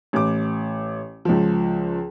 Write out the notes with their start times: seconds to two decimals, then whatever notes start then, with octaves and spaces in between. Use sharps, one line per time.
0.13 A1 D6
1.25 C#2 F3